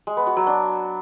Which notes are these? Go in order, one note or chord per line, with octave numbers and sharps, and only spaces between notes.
G#3
B3
F#4
F#3
D4